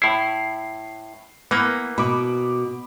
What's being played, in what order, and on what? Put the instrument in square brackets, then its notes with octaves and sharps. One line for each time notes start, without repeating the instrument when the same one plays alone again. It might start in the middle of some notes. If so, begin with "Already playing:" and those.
[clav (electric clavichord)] A2 E4 [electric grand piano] C7
[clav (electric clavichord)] E3 A#3 [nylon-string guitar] B3
[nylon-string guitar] B2 [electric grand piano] B5 D6